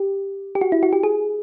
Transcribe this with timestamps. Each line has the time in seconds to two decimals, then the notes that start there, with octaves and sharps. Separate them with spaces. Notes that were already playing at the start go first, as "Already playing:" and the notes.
Already playing: G4
0.55 G4
0.61 F#4
0.72 E4
0.83 F#4
0.93 G4
1.03 G#4